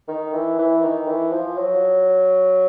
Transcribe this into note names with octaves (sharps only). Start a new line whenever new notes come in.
D#3
E3
E3
D#3
E3
F3
F#3